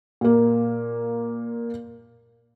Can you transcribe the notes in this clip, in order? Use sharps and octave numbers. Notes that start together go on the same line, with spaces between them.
A#2 A#3